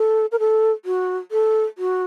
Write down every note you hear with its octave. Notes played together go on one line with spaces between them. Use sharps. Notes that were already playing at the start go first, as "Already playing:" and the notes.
Already playing: A4
A#4
A4
F#4
A4
F#4